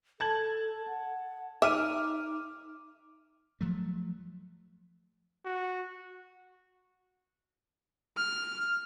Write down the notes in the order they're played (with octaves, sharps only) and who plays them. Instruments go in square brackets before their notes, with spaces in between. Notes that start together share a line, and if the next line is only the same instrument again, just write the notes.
[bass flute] A4 [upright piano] A5 G#6 F#7
[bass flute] F#5
[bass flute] D#4 [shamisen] E5 [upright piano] D6 F6 D#7
[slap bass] F3 F#3 A3
[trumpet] F#4
[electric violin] F6